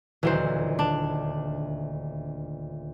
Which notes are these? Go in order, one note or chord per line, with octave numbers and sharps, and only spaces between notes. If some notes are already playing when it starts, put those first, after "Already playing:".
D#1 D2 E3 F#3 C5
D4